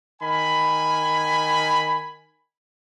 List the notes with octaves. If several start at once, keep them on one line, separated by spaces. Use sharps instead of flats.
D#3 G#5 B5